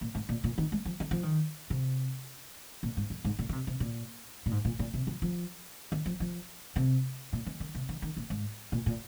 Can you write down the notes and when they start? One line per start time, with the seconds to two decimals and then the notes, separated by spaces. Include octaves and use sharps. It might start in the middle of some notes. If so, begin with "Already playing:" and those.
0.01 A#2
0.15 G#2
0.29 A#2
0.44 A#2
0.58 D#3
0.72 G#3
0.86 F3
1.00 D#3
1.11 F3
1.23 D#3
1.70 C3
2.83 A#2
2.97 G#2
3.10 F2
3.25 G#2
3.39 A#2
3.49 D#3
3.53 C3
3.67 C3
3.80 A#2
4.46 A#2
4.51 G#2
4.65 A#2
4.79 A#2
4.94 C3
5.07 F3
5.22 F3
5.92 D#3
6.06 F3
6.20 F3
6.76 C3
7.33 A#2
7.47 D#3
7.60 D#3
7.75 C3
7.89 D#3
8.02 D#3
8.17 A#2
8.30 G#2
8.72 A#2
8.86 A#2